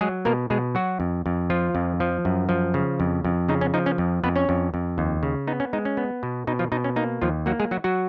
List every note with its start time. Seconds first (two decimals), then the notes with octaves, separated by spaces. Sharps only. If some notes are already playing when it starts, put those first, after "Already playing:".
0.01 F#3 G#3 G#4
0.25 B2 A#3 A#4
0.50 B2 G#3 G#4
0.75 F#3 F#4
1.00 F2
1.26 F2
1.50 F3 F4
1.75 F2
2.00 F3
2.25 F#2
2.49 F3
2.74 C#3
3.00 F2
3.24 F2
3.49 C#3 D#4
3.61 C#4
3.74 F3 D#4
3.86 C#4
3.98 F2
4.23 F2 B3 B4
4.36 C#4 C#5
4.49 F2
4.74 F2
4.98 D#2
5.23 C#3
5.47 B3 D#4
5.60 C#4
5.73 G#3 D#4
5.85 C#4
5.97 B3
6.23 B2
6.47 B2 D#4
6.59 F3 F4
6.72 B2 D#4
6.84 C#4
6.96 A#3 D#4
7.21 D#2 F3 F4
7.46 F#3 A#3 F#4
7.60 G#3 G#4
7.71 F#3 F#4
7.84 F#3 F#4